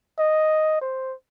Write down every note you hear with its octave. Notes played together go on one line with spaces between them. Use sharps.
D#5
C5